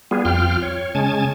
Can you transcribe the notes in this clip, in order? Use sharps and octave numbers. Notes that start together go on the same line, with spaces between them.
G3 B3 F4 G#4
F2 F4 G5 F6
C#5
C#3 G#3 C#4 G#5 A5